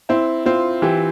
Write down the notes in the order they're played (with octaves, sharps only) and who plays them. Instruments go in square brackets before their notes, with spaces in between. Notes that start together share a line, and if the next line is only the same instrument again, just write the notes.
[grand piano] C4 [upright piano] E4
[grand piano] C4 [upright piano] F4
[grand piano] E3 [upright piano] G4